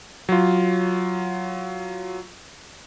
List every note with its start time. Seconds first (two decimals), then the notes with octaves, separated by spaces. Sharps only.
0.29 F#3 F4